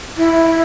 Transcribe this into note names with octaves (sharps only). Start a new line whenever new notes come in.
E4